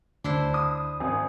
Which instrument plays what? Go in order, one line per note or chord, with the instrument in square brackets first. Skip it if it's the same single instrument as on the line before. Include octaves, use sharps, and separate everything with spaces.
[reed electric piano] D2 [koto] D4 E4 C5
[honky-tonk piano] D#6
[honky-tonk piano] G#1 [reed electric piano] G#5 D#6